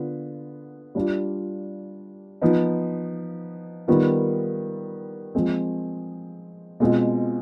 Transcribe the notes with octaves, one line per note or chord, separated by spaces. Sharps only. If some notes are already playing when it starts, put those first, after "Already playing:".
Already playing: D3 B3 F4
G3 D4 F4
F3 B3 D#4
D#3 G3 B3 F4
F3 G#3 C4
B2 G#3 C4 F4